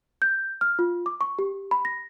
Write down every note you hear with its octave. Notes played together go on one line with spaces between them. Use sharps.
G6
F6
F4
D6
C#6
G4
B5
A#6